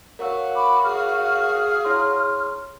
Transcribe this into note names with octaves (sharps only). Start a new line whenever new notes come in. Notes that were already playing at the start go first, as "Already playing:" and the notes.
F#4 A#4 C#5 F5 E6
B5 D6
G#4 F6
E4 C#5 C6